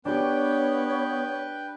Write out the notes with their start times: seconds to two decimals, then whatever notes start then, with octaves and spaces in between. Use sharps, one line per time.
0.05 B3 D4 G4 B4 C#5 G5